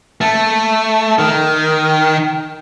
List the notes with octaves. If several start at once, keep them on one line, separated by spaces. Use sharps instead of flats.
A3
D#3